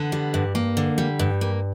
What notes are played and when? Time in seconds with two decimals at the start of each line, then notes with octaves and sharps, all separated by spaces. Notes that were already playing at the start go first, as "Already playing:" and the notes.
Already playing: D3 B3
0.12 G3
0.34 G2
0.55 A#3
0.77 D3
0.98 G3
1.19 G2
1.41 A#3